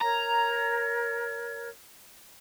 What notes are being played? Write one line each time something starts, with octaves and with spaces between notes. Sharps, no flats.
A#4 C#5 A#5